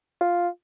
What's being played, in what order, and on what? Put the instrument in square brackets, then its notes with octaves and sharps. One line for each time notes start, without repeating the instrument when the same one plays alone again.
[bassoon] F4